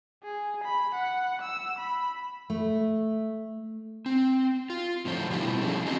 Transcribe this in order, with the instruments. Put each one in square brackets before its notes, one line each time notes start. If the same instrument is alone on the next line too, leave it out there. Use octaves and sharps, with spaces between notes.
[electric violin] G#4
B5
F#5
E6
B5
[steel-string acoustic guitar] A3
[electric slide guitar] C4
F4
A2 D3 F3 C5
B2 F3 G3 E4 G4
F3 A3 C#4 G#4
D3 C4 F#4 G4 A4 D#5